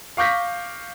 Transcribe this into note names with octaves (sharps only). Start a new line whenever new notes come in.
F5 C#6 D6 G6 A#6 B6